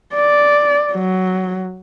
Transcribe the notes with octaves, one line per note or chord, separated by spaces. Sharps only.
D5
F#3